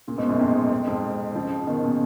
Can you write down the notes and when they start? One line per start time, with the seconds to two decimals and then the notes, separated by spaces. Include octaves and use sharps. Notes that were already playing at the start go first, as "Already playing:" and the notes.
0.08 A#2 C#3
0.18 G#2 B2
0.28 F#2 A#2
0.39 F2 G#2
0.72 F2
0.87 F2 G#2
1.35 C#3 F3
1.67 B2 D#3
1.83 A#2 C#3